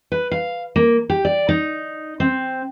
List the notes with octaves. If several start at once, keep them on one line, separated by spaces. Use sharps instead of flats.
B4
F5
A#3
G4
D5
D#4
C4